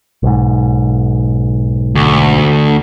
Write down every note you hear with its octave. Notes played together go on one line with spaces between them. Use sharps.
B1 G#2
D2